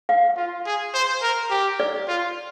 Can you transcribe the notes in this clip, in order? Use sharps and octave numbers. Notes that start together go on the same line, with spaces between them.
F5
F4
G#4
C5
A#4
G4
D5
F4